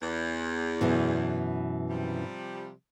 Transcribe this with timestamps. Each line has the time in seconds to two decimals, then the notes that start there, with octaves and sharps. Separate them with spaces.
0.02 E2
0.81 F#2 B2 E3
1.90 C3 F3 G3